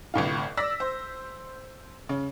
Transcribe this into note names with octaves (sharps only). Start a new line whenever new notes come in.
G1 C2 A2 F4
D5 E6 A#6 B6
C5
C#3